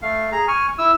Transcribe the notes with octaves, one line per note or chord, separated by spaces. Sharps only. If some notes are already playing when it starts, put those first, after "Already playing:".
A3 F5
G#4 A#5
G#5 C#6 F6
E4 E6